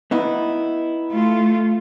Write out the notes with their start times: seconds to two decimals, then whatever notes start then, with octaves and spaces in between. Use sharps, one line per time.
0.11 B3 D#4 E4
1.12 A3 F4